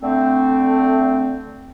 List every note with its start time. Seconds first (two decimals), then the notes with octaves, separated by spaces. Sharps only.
0.02 D3 A3 C4